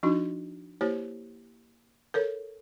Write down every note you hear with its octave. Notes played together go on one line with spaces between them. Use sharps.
F3 D4 D#4 F#4
A#3 E4 G4 C5 C#5
A4 A#4 C#5